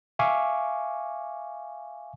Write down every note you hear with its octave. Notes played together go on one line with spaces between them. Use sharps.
E5 F5 G#5 C#6 D6